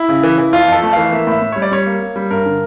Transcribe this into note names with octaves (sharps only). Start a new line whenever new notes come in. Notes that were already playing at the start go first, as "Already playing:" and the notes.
Already playing: E4
C#3
E3
E3
F2 F4
F2 A4
A3
E3 F5
A#3 E5
A2 E5
A2
G3 C#5
D5
G3 C#5
A#3
A#3
G3
G2 A#4
D3